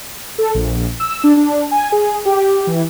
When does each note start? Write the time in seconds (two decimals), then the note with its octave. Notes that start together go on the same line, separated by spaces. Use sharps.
0.38 A4
0.55 A#1
1.00 E6
1.24 D4
1.37 D4
1.71 G#5
1.92 G#4
2.26 G4
2.67 E3